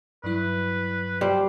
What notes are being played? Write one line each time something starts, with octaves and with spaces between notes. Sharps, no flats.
G2 F#3 E4 B4
G3 C5